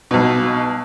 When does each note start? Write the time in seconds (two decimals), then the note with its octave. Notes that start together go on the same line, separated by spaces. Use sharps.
0.11 B1 B2